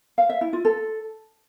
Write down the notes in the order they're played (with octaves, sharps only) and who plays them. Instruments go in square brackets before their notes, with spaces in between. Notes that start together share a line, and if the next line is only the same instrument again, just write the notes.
[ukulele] F5
E5
E4
F4
A4